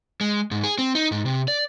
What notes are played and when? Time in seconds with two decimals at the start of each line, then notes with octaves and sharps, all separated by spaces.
0.21 G#3
0.51 G#2
0.64 G#4
0.78 C4
0.95 D#4
1.12 G#2
1.26 C3
1.48 D5